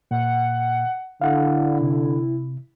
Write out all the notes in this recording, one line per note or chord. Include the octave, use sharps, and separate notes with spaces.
A#2 F#5
D3 E4 F5 F#5
C3